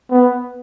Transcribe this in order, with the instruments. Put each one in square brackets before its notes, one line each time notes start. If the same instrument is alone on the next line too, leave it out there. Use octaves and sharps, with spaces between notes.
[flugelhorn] B3